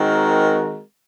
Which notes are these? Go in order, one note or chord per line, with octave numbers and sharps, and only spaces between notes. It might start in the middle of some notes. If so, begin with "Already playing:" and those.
Already playing: D#3 G#3 C4 F#4 A#4